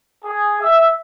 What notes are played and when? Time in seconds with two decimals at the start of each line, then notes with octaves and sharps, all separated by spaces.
0.23 G#4
0.60 E5